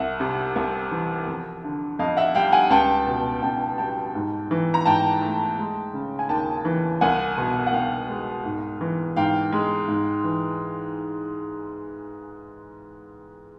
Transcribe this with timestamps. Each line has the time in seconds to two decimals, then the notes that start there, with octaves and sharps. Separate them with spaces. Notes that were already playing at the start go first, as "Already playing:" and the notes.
Already playing: C2 E5 F#5
0.20 C3
0.56 C2
0.91 E3
1.27 F2
1.64 D3
1.99 F2 D#5 F5
2.17 E5 F#5
2.35 G3 F5 G5
2.52 F#5 G#5
2.70 C#2 G5 A5
3.07 B2
3.42 C#2 G5 A5
3.78 G3 G5 A5
4.15 G#2
4.51 E3
4.74 A#5
4.86 G#2 G5 A5
5.22 A3
5.58 G#3
5.93 C#3
6.19 G#5
6.29 D#2 G5 A5
6.65 E3
7.01 C2 F#5 G#5
7.38 B2
7.66 F#5
7.73 C2 F5 G5
8.08 G#3
8.45 G#2
8.81 E3
9.16 G#2 F5 G5
9.52 G#3
9.88 G#2
10.24 E3